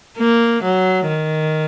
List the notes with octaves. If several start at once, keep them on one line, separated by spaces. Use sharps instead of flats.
A#3
F#3
D#3